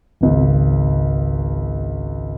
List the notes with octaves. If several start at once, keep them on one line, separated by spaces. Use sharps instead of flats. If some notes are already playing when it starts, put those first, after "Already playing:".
G#1 C#2